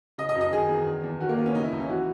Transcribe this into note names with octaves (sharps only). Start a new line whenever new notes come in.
C#3 D#5
D#5
F#2
D#5
D#3 G#4
E2
D#3
E2
D#3 F#4
A#3
E2 B3
C#4
C#3 D#4
E4
C#2 D#4
C#4
E3 F#4